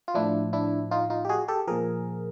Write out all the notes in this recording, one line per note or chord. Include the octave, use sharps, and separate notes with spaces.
F4
A2 F3 D4 E4
D4 E4
D#4 F4
D#4 F4
G4
F#4 G#4
G4 A4
A#2 F3 G#4 A#4